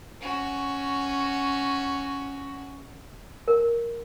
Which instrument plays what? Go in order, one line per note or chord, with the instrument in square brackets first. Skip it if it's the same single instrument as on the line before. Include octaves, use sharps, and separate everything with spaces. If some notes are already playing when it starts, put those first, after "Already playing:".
[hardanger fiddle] C#4 F#4
[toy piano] A#4